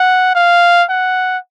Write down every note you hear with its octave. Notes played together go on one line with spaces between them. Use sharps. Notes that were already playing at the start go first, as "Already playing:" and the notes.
Already playing: F#5
F5
F#5